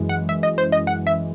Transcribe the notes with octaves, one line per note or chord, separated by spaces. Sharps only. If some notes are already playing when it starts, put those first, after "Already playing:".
Already playing: F#2 E3 G#3
F#5
E5
D#5
C5
D#5
F#5
E5